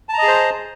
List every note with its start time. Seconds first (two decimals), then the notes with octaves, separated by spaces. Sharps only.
0.09 A5
0.13 A#5
0.18 D#5
0.23 G#4
0.28 C5